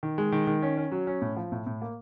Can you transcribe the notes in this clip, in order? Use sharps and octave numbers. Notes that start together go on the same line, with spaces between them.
D#3
G#3
D#3
D#3
C#4
C#4
F#3
C#4
A2
F3
A2
A2
A#3